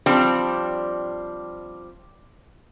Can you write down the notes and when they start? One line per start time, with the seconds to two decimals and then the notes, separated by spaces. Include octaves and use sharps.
0.06 F3 G3 C4 D4